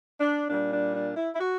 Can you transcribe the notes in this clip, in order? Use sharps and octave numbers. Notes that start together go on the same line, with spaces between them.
D4
A#2 G3 D4
D4
D4
E4
E4
F#4